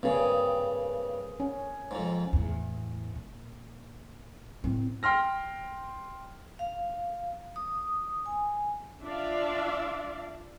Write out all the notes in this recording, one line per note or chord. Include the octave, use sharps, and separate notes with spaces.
G2 C#3 A#3 C4 G#4
C#4
F2 G#2
E2 A2
A#2
A2 C4
G5 C6 F6 A#6
F5
D#6
G#5
D4 F4 D5 E5 F5